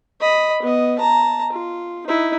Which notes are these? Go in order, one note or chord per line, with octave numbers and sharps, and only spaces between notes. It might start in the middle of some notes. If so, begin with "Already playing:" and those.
D#5 B5
B3 D#5
A5 A#5
F4
D#4 E4